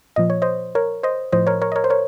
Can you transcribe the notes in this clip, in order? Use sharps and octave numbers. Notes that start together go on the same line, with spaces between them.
A#2 F3 D#5
C#5
C5 D#5
A#4 C#5
C5 D#5
A2 F3 C5 D#5
A#4 C#5
A#4 C#5
D#5
A#4 C#5
C5
A#4 C#5